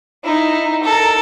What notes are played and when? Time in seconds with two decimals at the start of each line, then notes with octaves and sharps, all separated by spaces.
0.24 D#4 E4
0.83 A4 A#4